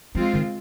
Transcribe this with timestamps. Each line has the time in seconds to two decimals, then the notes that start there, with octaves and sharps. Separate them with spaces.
0.15 F3 G#3 C4 F4
0.34 D#3